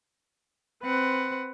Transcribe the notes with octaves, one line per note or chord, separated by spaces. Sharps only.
C4 B4 C5 F#5